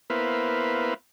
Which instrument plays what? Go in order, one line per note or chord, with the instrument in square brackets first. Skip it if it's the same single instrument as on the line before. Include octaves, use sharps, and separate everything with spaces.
[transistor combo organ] A#3 B3 E4 B4 C5 F5